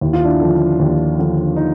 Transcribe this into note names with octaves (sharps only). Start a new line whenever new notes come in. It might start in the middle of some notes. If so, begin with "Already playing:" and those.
D#2 E4
F4
D4 E4
D3 F3
D#2
D3 F3
D#4